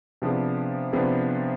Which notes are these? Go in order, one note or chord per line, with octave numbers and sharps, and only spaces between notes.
C3 F3 B3 D4 G#4
C3 F3 B3 D4 G#4